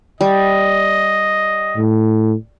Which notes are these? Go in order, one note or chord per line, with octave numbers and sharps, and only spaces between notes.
G3 D#5
A2